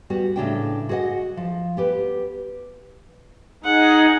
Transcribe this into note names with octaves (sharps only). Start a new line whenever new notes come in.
G3 B3 F#4
A2 C#3 D4 G5
F#4 G#4 C5 D#5 F#5
F3
B3 G4 B4
D#4 G#4 F#5